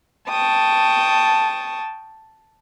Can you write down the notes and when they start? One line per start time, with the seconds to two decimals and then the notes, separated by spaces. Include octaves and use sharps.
0.31 G5 A5 C#6 D#6